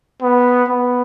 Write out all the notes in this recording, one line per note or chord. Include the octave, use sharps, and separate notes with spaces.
B3
B3